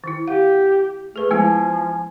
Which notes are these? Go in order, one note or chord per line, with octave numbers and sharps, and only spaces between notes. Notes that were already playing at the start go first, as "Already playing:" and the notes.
D#3 E4
G4 F5 F#5
A3 G#4 B4
F3 G#3 B3 E4 G#5